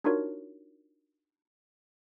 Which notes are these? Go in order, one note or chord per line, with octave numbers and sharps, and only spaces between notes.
D4 D#4 F4 F#4 A#4 C#5